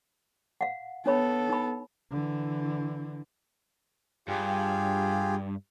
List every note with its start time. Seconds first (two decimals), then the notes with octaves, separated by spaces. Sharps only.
0.61 F5 F#5
1.06 B3 D4 A4 C#5 B5
1.49 D#4 B5
2.11 D3 E3
4.28 G2 F4 G4 G#4